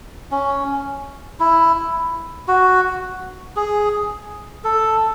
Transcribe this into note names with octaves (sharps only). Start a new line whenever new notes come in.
C#4
E4
F#4
G#4
A4